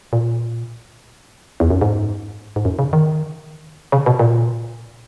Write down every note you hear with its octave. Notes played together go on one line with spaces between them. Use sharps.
A#2
E2
F#2
G#2
G#2
F#2
C#3
D#3
C#3
B2
A#2